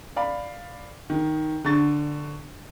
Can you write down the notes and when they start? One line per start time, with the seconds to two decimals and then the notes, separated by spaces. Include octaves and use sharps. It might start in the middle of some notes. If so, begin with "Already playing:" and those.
0.16 D5 F5 B5
1.10 D#3
1.65 D3 C#6 A6